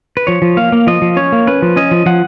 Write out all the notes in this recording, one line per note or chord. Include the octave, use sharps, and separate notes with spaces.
B4
F3 C#5
F3
A#3 F5
A#3
F3 D#5
F3
C#4 C#5
A#3
C#4 B4
F3
C#4 D#5
F3
F3 F#5